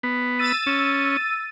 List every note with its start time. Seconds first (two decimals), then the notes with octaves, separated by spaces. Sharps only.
0.03 B3
0.39 E6 A6 D#7
0.67 C#4